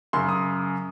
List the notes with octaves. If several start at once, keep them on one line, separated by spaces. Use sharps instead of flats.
F#2 C#3 C6
D#6